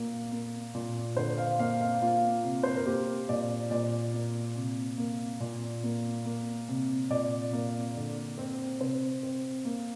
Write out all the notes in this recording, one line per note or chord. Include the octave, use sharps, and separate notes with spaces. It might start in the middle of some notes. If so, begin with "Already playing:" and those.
Already playing: A#2 A#3
A#3
A#2
D3 C5
F5
A#3 F5
F5
A#3 F4
C3
C5
A#4
A#3 G4
A#2 D5
A#2 D5
A#3
C3
A#3
A#2
A#3
A#3
C3
A#2 D5
A#3
D3
C4
C3 C5
C4
A#3